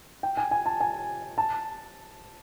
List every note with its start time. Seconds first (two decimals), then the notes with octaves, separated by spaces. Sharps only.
0.23 G5
0.37 G#5
0.51 G#5
0.66 A5
0.80 G#5
1.38 A5